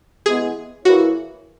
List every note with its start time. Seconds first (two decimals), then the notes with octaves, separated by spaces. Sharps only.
0.25 E3 G#3 B3 G#4
0.85 E3 A#3 E4 F#4 G#4 C#5